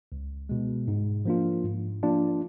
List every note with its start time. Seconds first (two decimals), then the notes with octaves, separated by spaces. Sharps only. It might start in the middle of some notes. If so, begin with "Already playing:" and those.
0.12 C#2
0.49 B2 G#3
0.88 G#2
1.25 F3 A#3 D4 F4
1.63 G#2
2.03 F3 A#3 D4 F4